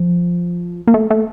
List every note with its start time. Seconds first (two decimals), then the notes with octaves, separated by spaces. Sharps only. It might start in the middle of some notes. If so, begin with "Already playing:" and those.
Already playing: F3
0.87 A#3
0.94 A3
1.10 A3